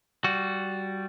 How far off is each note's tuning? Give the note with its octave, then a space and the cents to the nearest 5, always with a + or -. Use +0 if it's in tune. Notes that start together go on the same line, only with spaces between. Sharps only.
G3 -15 F#4 +0